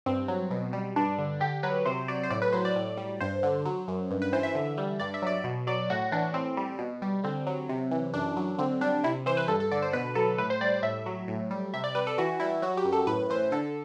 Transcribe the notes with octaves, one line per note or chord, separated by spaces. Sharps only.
G2 C4
F#3
B2
G3
G2 D4
D3
D3 G4
F#3 B4
C3 C5
F#3 D5
C5
A2 D5
B4
F#3 C5
D5
A2
G3
G2 C5
D3
F#3
F#2
G2
B4
E3 C5
E5
D3
G3
G2 D5
E5
F#3 D5
B2
F#3 D5
A2 F#4
E3 D4
A2 C4
G3
B2
G3
D3 C4
F#3
C3
E3
F#2 D4
F#3
D3 C4
G3 D4
C3 E4
E3 C5
B4
G2 A4
A4
D3 D5
C5
B2 B4
F#3 A4
A2 B4
C5
G3 D5
A2 E5
F#3
A2
G3
C3 E5
D5
G3 B4
A4
E3 F#4
G3 E4
F#3 F#4
G4
F#2
A4
A2 B4
E3 C5
D3 A4